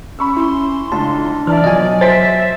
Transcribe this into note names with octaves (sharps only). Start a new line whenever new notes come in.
C#4 B5 C#6 E6
E4 C6
C#2 D4 A5
E3 D5 E5 A5 F6
B2 F3 F#3 D#5 G#5
C5 E5 A6 B6 D7